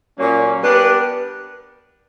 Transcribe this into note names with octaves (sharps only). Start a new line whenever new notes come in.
A#2 F#3 A#3 C#4
G3 B3 D4 G4 A#4